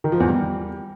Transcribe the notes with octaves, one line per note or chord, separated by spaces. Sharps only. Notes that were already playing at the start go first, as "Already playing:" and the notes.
D#3
F3
E2
G3